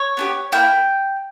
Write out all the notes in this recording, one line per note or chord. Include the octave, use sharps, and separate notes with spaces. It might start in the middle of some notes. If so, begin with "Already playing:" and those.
Already playing: C#5
B3 D4 G4
A#3 E4 G5